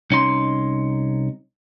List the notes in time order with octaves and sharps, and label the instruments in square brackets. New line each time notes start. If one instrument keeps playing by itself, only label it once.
[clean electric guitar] C2 C#4 D#4 C6